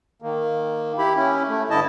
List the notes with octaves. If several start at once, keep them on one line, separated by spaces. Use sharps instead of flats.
D#3 A#3
E4 G4 B5
C#4 E4
A3
G2 D3 E4 D#5 A5